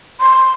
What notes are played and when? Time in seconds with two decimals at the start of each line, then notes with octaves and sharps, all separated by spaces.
0.20 C6